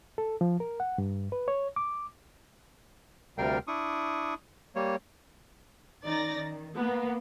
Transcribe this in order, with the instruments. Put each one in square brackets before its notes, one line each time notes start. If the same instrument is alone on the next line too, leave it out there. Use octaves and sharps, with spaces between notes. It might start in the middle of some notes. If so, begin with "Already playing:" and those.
[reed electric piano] A4
F3
A#4
F#5
G2
B4
C#5
D6
[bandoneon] D2 C3 G3 A#4 F5 G5
D4 E4 C#6 D#6
G3 A#3 C#5
[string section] D#3 C#4 D#4 D5 A6 A#6
D#3
A#3 B3